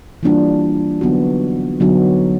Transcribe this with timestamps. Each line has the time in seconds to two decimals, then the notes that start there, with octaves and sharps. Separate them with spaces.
0.23 E3 G3 A#3 D4 F4
1.01 D3 F#3 B3 D#4 F#4
1.80 D3 F#3 B3 D#4 F#4